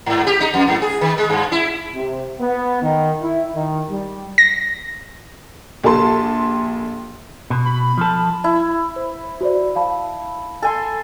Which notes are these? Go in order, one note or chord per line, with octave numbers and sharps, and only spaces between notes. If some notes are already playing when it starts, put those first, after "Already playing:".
G#2
G4
D#4
F2
G#2
G#4
D#3
G#3
G2
E4
C3
B3
D#3
E4
D#3
G3
A#6
A#1 G4 A4 A5 C6
B2
B5
F3 A4
E4
C5
F#4 C5 D5
F5 A5 B5
A4 G#5 C6